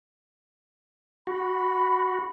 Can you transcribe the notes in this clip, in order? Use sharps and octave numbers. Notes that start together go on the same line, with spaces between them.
F#4 B5